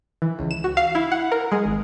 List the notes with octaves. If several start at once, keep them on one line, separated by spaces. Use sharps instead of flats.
E3
C#2
E7
F#4
F5
E4
F#5
A#4
G#3
G#1